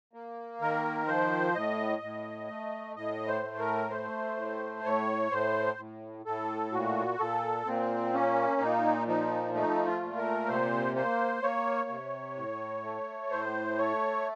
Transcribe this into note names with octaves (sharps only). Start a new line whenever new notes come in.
A#3
D#3 A#4
F3 C5
A2 D#5
A2
A3
A2 D#5
C5
A3
A#4
A3 C5
A2
A2 C#5
A2 C5
A2
A2 A4
A#2 F#4
A#2 A4
A#2 C4
A#3 C#4
A#2 D#4
F3 D#4
A3 D#4
F4
A#2
A#4
C3 C5
A#3 C5
A#3 C#5
C3
A2
A3
A2 C5
A3 C#5